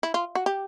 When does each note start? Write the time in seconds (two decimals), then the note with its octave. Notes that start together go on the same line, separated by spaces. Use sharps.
0.03 E4
0.14 F4
0.35 F#4
0.46 G4